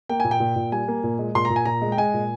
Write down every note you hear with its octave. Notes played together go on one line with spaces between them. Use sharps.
A#3 G5
A#2 G#5
G5
A#2
A#2
G3 G#5
A#3
A#2
G#3
A#2 C6
A#5
A#2
G#5
A#2 A#5
G#3
G5
G#3 G#5
A#2